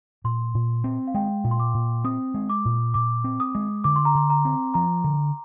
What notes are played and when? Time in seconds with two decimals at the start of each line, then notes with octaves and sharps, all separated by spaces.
0.24 A#2 C6
0.54 A#2
0.84 C4
1.07 F5
1.14 G#3 G5
1.44 A#2
1.51 C6
1.60 D6
1.74 A#2
2.04 C4 D#6
2.34 G#3
2.49 D6
2.65 A#2
2.94 A#2 D6
3.24 C4
3.40 D#6
3.55 G#3
3.84 D3 D6
3.96 C6
4.05 A#5
4.15 D3 C6
4.30 A#5
4.45 C4
4.74 F3 A#5
5.04 D3